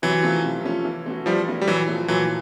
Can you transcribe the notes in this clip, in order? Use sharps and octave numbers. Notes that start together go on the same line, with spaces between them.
C3 E3 F#3
F3 A3 C#4 F4
C3
F3 A3 C#4 F4
E3
A3 C#4 F#4
E3 F3 G3
A3 C#4 F#4
G3
A#2 E3 F#3
F3 A3
A#2 E3 F#3